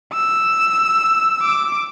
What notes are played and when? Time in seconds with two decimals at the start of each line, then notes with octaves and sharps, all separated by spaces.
0.14 E6
1.42 D6